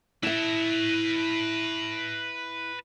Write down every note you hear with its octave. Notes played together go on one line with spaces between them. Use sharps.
E4 B4 E5 A5